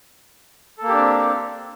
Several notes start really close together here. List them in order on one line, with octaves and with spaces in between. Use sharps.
A4 A#3 G4 D4 C4